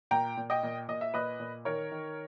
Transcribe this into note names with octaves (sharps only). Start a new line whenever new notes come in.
A#2 G5 A#5
A#2
D#5 G5
A#2
A#2 D#5
E5
A#2 B4 D#5
A#2
D#3 A#4 C#5
D#3